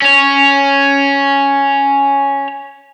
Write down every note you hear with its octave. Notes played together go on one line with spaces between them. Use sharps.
C#4 C#5